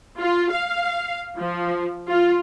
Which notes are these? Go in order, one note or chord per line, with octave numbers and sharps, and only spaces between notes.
F4
F5
F3
F4